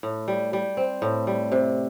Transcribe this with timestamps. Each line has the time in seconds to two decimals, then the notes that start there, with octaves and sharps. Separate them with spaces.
0.03 A2
0.28 G3
0.53 G3
0.77 C4
1.02 A2
1.27 G3
1.52 C3